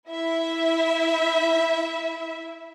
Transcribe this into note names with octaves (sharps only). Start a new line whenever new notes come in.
E4 E5